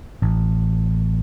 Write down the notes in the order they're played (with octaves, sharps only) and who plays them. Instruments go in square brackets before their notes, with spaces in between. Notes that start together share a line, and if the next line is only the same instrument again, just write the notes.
[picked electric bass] A1